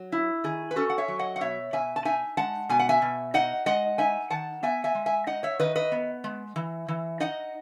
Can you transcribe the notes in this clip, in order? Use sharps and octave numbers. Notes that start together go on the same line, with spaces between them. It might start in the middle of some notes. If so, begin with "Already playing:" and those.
Already playing: F#3
E4
D#3 G#4
B4
C#4 F#4 A4
F#5
C#5 E5
F#3
D#5 F#5
F#5
B2 C#5 E5
B2 E5 G#5
A5
D#4 E5 G#5
G#3 F#5 A5
B2 G#5
F#5
E5 G#5
B2
D#4 D#5 F#5
G#3 D#5 F#5
D#4 E5 G#5
D#3 F#5 A5
B3 E5 G#5
E5 G#5
G#3
E5 G#5
D#4 D#5 F#5
C#5 E5
D#3 B4 D#5
B4 D#5
B3
G#3
E3
E3
D#4 D#5 F#5